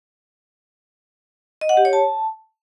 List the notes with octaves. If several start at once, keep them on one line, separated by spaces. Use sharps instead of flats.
D#5
F#5
G4
C#5
A5